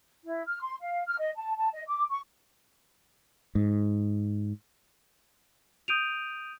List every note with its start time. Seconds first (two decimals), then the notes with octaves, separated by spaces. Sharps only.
0.24 E4
0.46 F6
0.61 C6
0.81 F5
1.07 F6
1.18 D#5
1.36 A5
1.56 A5
1.73 D#5
1.87 D6
2.09 C#6
3.55 G#2
5.88 D#6 G6 D7 D#7 F7